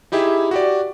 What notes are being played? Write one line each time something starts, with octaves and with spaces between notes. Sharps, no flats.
D#4 E4 G4 G#4 E5
F#4 G4 D5